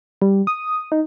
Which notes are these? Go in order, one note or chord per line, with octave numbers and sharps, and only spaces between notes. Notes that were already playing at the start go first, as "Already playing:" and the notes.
G3
D#6
D#4